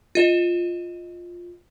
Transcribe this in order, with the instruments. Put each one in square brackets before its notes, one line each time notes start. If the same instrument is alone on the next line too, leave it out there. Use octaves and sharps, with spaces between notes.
[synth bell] F4 D#5 E7